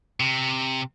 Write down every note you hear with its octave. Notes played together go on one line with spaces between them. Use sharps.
C3